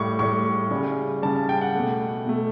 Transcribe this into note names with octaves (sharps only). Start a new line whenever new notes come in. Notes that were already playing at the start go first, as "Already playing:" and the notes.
Already playing: A2 G3 C#6
A2 G3 C#6
C#3 G3
C#3 G3 A5
A5
G5
F#5
B2 A3
B2 A3